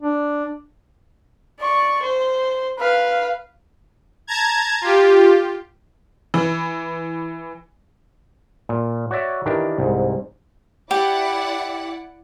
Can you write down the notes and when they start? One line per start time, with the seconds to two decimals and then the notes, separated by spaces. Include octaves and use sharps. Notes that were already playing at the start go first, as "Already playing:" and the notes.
0.03 D4
1.60 D5 C#6
2.03 C5
2.79 B4 F5
4.27 A5 A#5 G#6
4.81 F4 G4
6.34 E3
8.69 A#2
9.11 F#4 C#5 D5 E5
9.46 D#3 E3 D4 G4 A#4
9.79 C2 G#2
10.91 E4 G4 D5 F#5